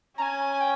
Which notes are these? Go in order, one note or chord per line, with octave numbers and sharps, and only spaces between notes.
C#4 G#5 A#5
G5